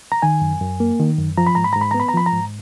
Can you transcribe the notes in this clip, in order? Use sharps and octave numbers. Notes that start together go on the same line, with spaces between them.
A#5
D#3 G#5
F#2
F#2
A#3
D#3
F#2
F3 A#5
B5
G#2 A#5
B5
G#2 A#5
B5
B3 A#5
B5
A#5
F3 B5
A#5
G#2